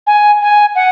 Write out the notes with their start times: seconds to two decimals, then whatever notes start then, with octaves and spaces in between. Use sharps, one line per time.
0.07 G#5
0.42 G#5
0.75 F#5